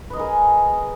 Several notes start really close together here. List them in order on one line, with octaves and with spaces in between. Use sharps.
B4 D#5 A#4 G#4